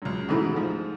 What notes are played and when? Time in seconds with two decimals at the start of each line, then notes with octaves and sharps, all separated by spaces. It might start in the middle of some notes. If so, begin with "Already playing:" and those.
0.02 C#2 F#2
0.29 G#2 B2 E3 A3 E4
0.56 G#2 F3